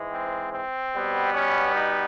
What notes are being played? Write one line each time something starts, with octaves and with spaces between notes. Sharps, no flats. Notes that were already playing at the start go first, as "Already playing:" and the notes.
Already playing: G#2 E3 G#3
C4
C4
B2 G3 B3
C#4
D#4